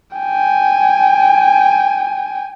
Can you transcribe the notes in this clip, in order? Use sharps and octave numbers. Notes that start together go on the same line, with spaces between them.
G5 G#5